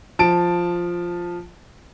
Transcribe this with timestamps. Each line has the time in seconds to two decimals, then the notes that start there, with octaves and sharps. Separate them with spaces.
0.19 F3 A5 D7